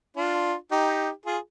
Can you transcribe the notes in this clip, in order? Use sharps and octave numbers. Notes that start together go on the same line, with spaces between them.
D4 F4
D#4 G4
F4 G#4